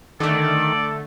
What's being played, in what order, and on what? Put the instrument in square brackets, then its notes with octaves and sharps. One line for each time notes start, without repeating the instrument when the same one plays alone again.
[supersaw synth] D3 A3 [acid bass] D#3 [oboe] A4 [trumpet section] D5